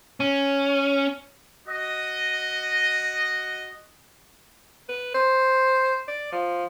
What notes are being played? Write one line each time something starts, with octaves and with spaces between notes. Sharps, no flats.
C#4
F#4 D#5
B4
C5
D5
F3